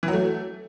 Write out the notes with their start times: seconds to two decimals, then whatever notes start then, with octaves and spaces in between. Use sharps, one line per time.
0.03 E3
0.08 F#3
0.13 A3